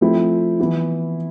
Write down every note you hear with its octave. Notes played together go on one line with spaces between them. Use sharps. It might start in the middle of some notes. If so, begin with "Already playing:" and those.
F3 A3 C4 E4
E3 B3 E4